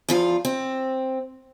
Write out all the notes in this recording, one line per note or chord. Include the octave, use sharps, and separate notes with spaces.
E2 F3 F4
C4